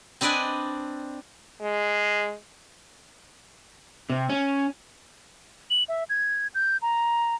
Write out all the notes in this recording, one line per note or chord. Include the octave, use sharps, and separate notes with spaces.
C4 D4 B4 D5 D#5 G#5
G#3
C3
C#4
F#7
E5
G#6
G6
A#5